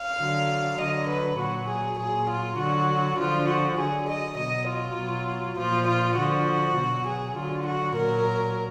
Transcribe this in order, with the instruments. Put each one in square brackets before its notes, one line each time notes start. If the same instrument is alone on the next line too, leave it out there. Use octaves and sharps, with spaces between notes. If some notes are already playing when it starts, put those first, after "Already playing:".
Already playing: [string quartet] F5
D3 F#3
D3 F#3 D#5
B4
A#2 F#3 F#4
G#4
A#2 F#3 G#4
F4
D3 F#3 F#4
D3 F3 F4
F#4
D3 F#3 G#4
D#5
B2 F#3 D#5
F4
B2 F#3
A#2 F3 F4
F4
D3 F3 F#4
B2 F#3
G#4
D3 F#3 F4
F#4
A#2 F#3 A#4